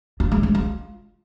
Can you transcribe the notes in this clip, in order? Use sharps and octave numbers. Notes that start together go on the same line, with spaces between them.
F4
G#3
G#3
F4